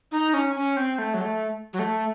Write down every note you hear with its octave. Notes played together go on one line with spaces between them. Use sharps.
D#4
C#4
C#4
C4
A3
F#3
A3
F#3
A3